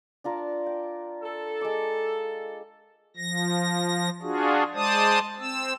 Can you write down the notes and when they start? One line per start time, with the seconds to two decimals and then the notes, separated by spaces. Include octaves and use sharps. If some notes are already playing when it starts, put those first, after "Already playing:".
0.24 D4 F4 A#4
0.66 G5
1.23 A4
1.61 G#3 D6
3.17 F3 A#6
4.22 D4 F4 F#4 G#4
4.74 G#3 C5 D5 A5 D#6
5.40 C4 E6